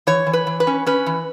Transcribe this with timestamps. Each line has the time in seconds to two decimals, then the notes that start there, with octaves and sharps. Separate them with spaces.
0.07 E3 C#5
0.26 E3
0.33 B4
0.47 E3
0.60 B4
0.67 C#4
0.86 C#4 B4
1.06 E3